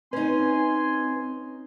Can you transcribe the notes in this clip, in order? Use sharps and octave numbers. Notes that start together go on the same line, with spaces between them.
C4 C#4 D#4 B4 G#5 C6